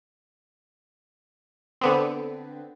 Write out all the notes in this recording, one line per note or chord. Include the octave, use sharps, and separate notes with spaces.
D3 B3 C4